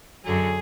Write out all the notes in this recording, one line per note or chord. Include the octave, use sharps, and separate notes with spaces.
F#2 D3 F#3 G#4